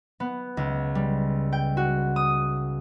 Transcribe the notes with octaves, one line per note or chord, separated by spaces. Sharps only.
B3
C#2
G3
G5
F#4
D#6